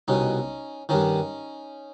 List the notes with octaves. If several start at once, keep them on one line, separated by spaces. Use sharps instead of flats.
C2 B2 C#4 D#4
G2 D#3 C#4 D#4